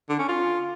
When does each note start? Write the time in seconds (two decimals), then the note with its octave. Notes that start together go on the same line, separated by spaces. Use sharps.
0.09 D3
0.19 C#4
0.29 F4